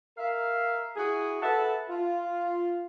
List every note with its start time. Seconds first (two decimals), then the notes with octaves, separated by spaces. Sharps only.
0.18 A#4 E5 F5
0.96 E4 F#4 G#4
1.41 A4 B4 E5 F#5 A5
1.89 F4